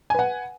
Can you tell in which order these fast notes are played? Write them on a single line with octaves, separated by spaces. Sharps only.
G#5 B4 F#5